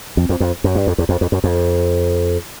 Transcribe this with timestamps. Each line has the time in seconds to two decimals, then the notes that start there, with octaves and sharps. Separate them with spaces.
0.17 F2
0.29 F2
0.40 F2
0.64 F#2
0.75 G2
0.87 F2
0.98 E2
1.09 F2
1.21 F2
1.32 F#2
1.44 F2